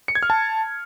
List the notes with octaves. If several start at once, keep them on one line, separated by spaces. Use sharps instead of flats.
C#7
G#6
F6
A5